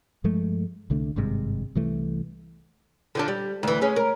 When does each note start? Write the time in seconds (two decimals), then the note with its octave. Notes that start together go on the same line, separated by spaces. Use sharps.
0.24 G2 F3 G#3 A3
0.90 C2 D3 A3 D4
1.16 G#1 G2 C3 G#3
1.75 C2 E3 A3
3.15 D3 F3 D4
3.28 G3
3.63 D2 E3
3.82 G#3 C#4
3.96 A#4